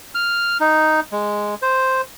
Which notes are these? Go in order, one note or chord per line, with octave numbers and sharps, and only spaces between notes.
F6
D#4
G#3
C5